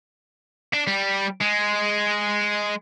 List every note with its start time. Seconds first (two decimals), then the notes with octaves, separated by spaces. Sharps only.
0.74 D4
0.87 G3
1.41 G#3